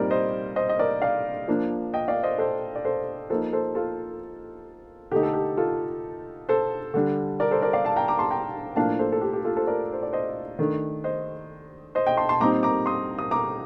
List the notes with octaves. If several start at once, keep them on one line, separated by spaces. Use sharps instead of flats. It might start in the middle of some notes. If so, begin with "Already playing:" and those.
Already playing: A#2 G3 C4 D#4 A#4 D5
C5 D#5
C5 D#5
D#5
A#4 D5
D5 F5
F3 A#3 D4
D#5 G5
D5 F5
C5 D#5
A4 C5
D5
A4 C5
F3 A#3 D#4 A4 C5
A4 C5
F4 A4
D3 A3 D#4 G4
A4
G4
F4 A4
A4 C5
D3 G3 D4
A#4 D5
A4 C5
A#4 D5
D5 F5
F5 A5
G5 A#5
A#5 D6
A5 C6
G5 A#5
A2 F3 A#3 D4 F5 A5
A4 C5
A4
G4
G4
F4 A4
A4 C5
A#4 D5
C5
D5
C5 D#5
D#3 A3 D4
C5 D#5
C5 D#5
D#5 G5
A5 C6
A5 C6
A#2 G3 C4 D#4 A#5 D6
A#5 D6
C6 D#6
D#6
A#5 D6